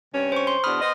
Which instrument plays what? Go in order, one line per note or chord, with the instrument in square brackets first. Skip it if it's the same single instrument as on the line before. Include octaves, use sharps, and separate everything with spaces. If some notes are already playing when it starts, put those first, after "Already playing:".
[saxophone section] G2 C3 C#4
[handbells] C5 C#6
C6
[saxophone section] E2 B2 D4 [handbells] B5 D#6 F6
[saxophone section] B3 C5 D#5